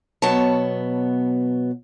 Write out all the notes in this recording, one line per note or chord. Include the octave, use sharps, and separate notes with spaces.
B2 F#3 B3 C#5 A5